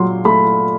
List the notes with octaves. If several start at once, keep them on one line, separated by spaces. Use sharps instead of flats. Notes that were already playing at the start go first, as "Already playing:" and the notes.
Already playing: A#2 F#3 C6
A3 B5